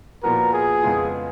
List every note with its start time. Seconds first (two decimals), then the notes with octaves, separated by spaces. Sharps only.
0.23 A#2 F3 B3 F#4 A#4
0.53 G#4
0.83 F2 C#3 G#3 B3 F4